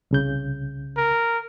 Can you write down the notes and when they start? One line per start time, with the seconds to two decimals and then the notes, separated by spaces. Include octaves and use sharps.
0.11 C2 C#3 G6
0.97 A#4